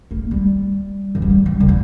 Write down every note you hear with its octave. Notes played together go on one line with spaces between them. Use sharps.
A#3
G3
E3
G3
E3
G3
D#3
E3